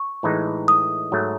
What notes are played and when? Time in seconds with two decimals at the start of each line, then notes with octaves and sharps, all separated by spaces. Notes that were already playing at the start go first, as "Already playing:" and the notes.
Already playing: C#6
0.23 A2 E3 G#3 D#4
0.68 D#6
1.12 G#2 F#3 A3